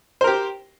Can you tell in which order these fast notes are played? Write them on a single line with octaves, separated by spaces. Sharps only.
C5 A#4 G4